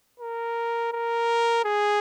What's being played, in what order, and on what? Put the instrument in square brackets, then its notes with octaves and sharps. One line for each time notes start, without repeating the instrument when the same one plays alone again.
[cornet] A#4
A#4
G#4